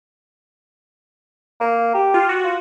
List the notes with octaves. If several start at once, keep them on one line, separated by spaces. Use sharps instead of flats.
A#3
G4
F4
F#4
F4